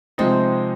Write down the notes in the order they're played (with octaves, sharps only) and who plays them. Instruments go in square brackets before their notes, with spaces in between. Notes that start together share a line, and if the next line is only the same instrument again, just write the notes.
[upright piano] C3 F3 G#3 D#4 [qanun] C4